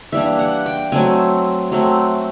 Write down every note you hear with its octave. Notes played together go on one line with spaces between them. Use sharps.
E3 G3 A#3 D4 E5
F#5
G5
F#3 A3 C4 G#5
F#3 A3 C4